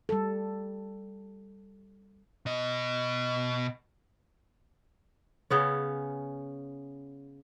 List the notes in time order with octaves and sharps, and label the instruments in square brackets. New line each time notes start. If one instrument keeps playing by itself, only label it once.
[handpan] G3 A4
[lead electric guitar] B2 D#5
[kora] C#3 B3 C#4